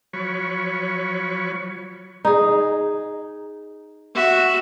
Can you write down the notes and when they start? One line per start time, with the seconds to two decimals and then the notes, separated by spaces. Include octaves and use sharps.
0.13 F3 F#3 C#5 B5 C#6
2.25 D#4 G#4
4.15 F#4 E5